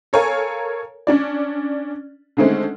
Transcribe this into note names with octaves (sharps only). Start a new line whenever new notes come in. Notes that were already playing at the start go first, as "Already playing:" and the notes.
A4 A#4 C#5 F5 G#5 A#5
C#4 D4 D5
D3 D#3 G#3 A3 C4 C#4